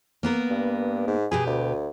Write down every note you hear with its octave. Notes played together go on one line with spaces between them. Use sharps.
A#3 B3 A#4
G2
G#2
B2 G4 G#4 B4
D2